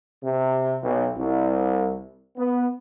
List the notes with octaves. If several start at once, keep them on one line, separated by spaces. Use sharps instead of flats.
C3
B1
C2
B3